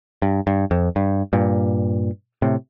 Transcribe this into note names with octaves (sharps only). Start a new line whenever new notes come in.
G2
G2
F2
G2
G2 A#2
A2 C3